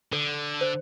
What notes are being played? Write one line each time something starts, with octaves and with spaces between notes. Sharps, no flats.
D3 A4
C5